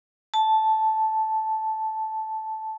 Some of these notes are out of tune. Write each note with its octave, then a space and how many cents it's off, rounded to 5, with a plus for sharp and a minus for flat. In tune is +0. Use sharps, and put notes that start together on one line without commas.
A5 -5